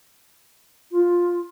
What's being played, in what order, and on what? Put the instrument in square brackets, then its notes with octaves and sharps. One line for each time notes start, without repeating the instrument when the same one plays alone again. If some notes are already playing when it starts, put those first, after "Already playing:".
[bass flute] F4